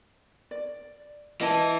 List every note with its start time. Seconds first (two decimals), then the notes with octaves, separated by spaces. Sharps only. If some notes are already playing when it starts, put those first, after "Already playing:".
0.51 D5
1.41 E3 E4 D#5 A5